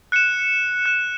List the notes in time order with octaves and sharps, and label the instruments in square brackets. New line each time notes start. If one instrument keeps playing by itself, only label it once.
[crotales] F#6 C#7 E7
F#6 C#7 E7